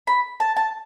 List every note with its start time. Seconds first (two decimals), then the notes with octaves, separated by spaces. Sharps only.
0.07 B5
0.40 A5
0.57 A5